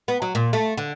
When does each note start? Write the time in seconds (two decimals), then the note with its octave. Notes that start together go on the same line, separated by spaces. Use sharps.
0.08 B3
0.22 F#3
0.35 A#2
0.53 A3
0.77 D3